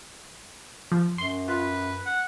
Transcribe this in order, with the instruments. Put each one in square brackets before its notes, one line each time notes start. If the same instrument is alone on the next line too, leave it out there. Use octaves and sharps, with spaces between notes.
[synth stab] F3
[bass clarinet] F#2 [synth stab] C6
[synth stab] F4 [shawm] B4
[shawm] F#5